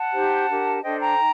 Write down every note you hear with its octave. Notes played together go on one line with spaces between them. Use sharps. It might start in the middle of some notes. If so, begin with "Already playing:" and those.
Already playing: F#5 A5
D#4 G4 C5
D4 G4 A#4
D4 A4 C5 D#5 G5
G5 A#5
D#4